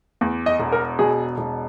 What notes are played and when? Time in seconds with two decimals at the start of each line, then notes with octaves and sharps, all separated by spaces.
0.21 E2
0.46 D#5
0.60 E1
0.72 A#4
0.99 B2 G#4
1.38 E1